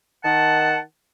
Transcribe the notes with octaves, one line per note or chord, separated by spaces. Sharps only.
D#3 F#5 A5